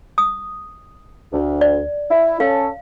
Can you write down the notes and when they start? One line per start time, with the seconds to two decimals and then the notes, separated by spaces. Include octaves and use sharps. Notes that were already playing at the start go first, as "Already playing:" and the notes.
0.18 D#6
1.33 D2
1.61 D5
2.11 E4
2.40 C#4 A4 F5